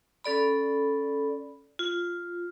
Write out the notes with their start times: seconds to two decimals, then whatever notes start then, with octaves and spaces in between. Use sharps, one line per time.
0.24 C#4 A4 D5 B5
1.79 F4